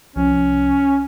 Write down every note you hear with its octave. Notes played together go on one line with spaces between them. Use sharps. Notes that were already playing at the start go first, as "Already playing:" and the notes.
C2 C3 F3 C#4